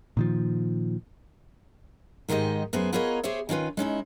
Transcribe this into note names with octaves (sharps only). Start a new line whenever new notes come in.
A#2 D#3 F3
G#2 D#3 G#3 G4 D#5
F#2 B3 G#4 C5
B3 F4 G#4 A#4 C#5 D#5
G4 G#4 C5 C#5 E5
D#3 C#4 F4 B4
G#3 C#4 D#4 E4